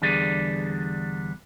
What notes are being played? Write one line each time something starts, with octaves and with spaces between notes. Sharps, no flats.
E2 D3 G3 G#4 D5